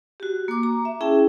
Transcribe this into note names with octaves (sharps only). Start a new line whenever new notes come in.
F#4 G4
A#3 D6
A#5
E5
C#4 E4 G#4 E5 G5 A5